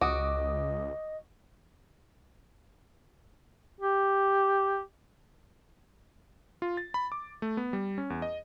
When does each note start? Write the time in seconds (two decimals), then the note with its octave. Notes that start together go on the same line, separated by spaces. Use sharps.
0.01 C#2 F#4 D#5 D6 D#6
3.81 G4
6.62 F4
6.77 A6
6.94 B5
7.12 D6
7.42 A3
7.57 B3
7.73 G3
7.98 C#4
8.10 E2
8.22 D#5